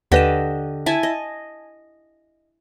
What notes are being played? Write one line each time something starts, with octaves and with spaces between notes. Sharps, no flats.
D#2 D3 G4 B4 D#5 E7
E4 G#5 A5
D#5